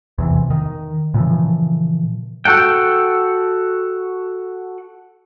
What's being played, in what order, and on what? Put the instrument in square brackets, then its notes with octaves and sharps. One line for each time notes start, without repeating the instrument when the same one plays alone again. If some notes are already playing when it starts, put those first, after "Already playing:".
[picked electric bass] E2 C3 E3
D#3
A#2 C#3 E3 F3
[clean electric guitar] F#4 A4 F#5 G5